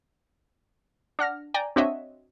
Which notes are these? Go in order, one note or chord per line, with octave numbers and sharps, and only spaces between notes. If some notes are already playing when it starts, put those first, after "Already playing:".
D4 F#5 F6 A#6
D5 G5 G#5 A#5
C4 D4 F#4 C#5 D#5 E5